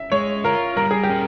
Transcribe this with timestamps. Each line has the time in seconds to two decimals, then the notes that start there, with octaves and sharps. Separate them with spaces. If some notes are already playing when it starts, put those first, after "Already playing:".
Already playing: E5
0.12 G#3 C#5
0.44 F4 A#4
0.76 G3 A#4
0.91 G#4
1.03 G4
1.09 C#4